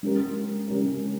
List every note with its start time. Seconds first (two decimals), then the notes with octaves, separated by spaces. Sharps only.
0.03 G#3 C#4 G4 A#4
0.67 G#3 C#4 G4 A#4